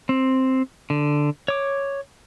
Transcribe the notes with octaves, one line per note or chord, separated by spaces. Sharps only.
C4
D3
C#5 D6